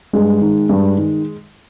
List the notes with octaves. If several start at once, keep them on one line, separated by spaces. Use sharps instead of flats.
G2 G#3
D#3
G2
D#3